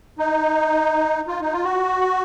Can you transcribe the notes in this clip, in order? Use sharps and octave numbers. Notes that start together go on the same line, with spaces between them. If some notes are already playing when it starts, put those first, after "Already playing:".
D#4
F4
D#4
F4
F#4